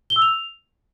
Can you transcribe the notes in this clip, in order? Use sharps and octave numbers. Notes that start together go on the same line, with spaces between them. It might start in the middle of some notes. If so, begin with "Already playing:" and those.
G7
E6
F7